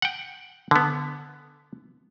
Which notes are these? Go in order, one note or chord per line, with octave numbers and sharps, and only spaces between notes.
F#5 G5
D3 B3